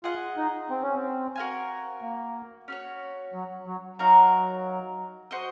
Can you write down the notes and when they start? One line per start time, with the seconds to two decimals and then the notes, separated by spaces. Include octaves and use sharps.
0.04 F4 G#4 D#5 F#5
0.37 D#4
0.70 C4
0.82 C#4
0.95 C4
1.36 F#4 A#4 F5 G#5
2.02 A#3
2.68 C#4 F#4 C#5
3.34 F#3
3.67 F#3
3.99 F#3 D#4 F#4 A#4 F5
5.31 F#4 C5 D#5